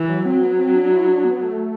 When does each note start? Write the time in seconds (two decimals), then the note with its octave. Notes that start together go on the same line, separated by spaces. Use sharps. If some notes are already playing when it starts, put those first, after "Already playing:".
Already playing: E3
0.09 F#3
0.26 F#3 C4
0.43 B3
0.59 C4
0.75 D4
0.92 E4
1.08 D4
1.25 B3
1.41 A3